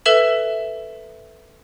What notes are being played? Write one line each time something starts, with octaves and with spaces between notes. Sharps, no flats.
A4 B4 E5 E7 F#7